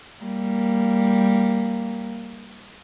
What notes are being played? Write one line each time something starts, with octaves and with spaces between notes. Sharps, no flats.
G3 A#3